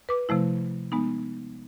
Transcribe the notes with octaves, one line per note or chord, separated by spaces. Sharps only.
B4 D6
C3 F3 A3 E4
G#3 B3 D#4